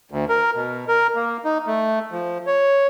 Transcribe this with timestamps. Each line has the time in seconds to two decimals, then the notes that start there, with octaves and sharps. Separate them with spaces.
0.11 D2
0.29 A#4
0.55 B2
0.88 A#4
1.16 A#3
1.45 D#4
1.66 A3
2.12 F3
2.47 C#5